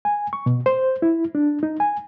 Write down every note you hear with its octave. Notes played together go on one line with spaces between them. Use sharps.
G#5
C#6
B2
C5
E4
D4
D#4
G#5